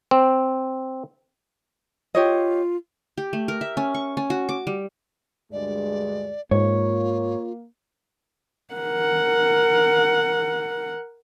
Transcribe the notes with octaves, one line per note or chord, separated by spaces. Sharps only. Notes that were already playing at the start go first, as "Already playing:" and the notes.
C4
F4 G4 C#5 D#5
G4
A3
A#4
E5
C#4
C#6
C#4
F#4
D6
G3
D2 G2 G#3 D5
G#2 A#3 F4 C#5
A#4 F#5